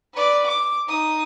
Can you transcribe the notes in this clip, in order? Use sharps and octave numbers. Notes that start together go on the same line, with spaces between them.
B4 D5
D6
D#4 D#6